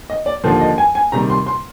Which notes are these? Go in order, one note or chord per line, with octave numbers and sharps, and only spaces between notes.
D#5
D5
D#2 D3 F3 A#3 C5
D#5
G#5
G#5
C3 D#3 G3 A#5
C6
C6